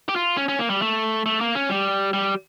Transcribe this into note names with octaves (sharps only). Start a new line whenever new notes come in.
G4
F4
C#4
C#4
A#3
G3
A3
A3
A#3
C#4
G3
G3